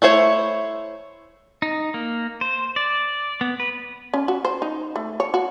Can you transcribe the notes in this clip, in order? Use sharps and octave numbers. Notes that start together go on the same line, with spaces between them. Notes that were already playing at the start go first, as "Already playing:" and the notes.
A3 E4 C5 C#5
D#4
A#3
C5
D5
B3
B4
C#4
F#4
C5
D#4
A3
C#5
F#4